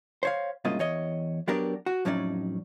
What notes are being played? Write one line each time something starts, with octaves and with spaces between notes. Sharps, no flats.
C5 C#5 F5
C2 G#2 C#3 A#3 F4 D#5
E2 C#5 D#5
F#3 B3 D4 G4 A#4 D5
F#4
F2 A2 F#3 C#4 D#4 D5